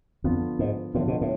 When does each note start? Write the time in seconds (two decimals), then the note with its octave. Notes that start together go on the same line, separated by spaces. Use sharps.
0.24 F2 D3 F3 B3 F4
0.59 G#2
0.94 A2 D3 F3 B3 F4
1.08 B2
1.21 A2